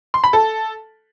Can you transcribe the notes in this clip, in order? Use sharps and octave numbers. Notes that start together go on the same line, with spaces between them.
C6
B5
A4